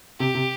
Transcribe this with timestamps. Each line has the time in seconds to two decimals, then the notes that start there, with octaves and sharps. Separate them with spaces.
0.20 C3 G4
0.35 C3